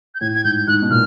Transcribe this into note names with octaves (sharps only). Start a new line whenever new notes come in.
G6
A2 G#6
G#6
G#2 G6
G#2 F#6
B2
A#2 F6